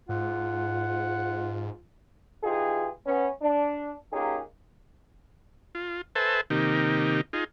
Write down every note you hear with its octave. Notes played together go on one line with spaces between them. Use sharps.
G#2 F4 F#5
E3 D#4 F4 G4 G#4
B3 C#4
D4
A#3 C#4 D#4 F4 G4 G#4
F4
A4 B4 C5 E5 G#5 A5
C3 D#3 A#3 D#4 G4
D#4 F4 G#4